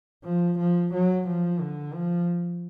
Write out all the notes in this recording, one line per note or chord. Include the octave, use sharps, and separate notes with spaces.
F3
F3
F#3
F3
D3
F3